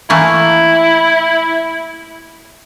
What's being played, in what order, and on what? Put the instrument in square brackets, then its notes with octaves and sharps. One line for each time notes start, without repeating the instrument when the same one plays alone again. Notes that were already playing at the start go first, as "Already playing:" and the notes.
[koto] E3 A3 A#3 [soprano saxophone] E4